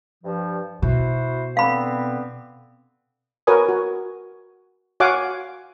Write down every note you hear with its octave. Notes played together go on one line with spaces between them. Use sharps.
G2 F3
B2 E4 F#4 C5
D3 B3 C4 F5 B5
F#4 A#4 B4 C#5 G#5 D#6
F#4
F#4 C#5 F5 F#5 G#5 D6